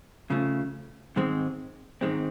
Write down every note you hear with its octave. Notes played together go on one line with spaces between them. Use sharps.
C#3 F3 A3
G#2 D#3 G#3 C4
G#2 D#3 G#3 C4